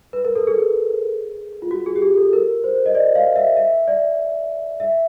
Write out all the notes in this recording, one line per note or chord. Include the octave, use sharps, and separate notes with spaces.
B4
A#4
A4
G#4
F4
F#4
G#4
G4
G#4
A4
A#4
C5
D#5
D5
F5
E5
E5
D5
E5